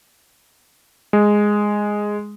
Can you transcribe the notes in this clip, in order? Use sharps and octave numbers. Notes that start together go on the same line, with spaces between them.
G#3